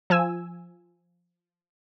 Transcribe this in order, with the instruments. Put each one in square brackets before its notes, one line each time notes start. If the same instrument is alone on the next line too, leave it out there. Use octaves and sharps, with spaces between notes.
[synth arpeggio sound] F3 G#5 E6